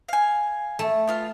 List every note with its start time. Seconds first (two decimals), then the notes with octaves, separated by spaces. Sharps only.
0.08 F5 G#5
0.79 A3
1.07 B3 F4 F5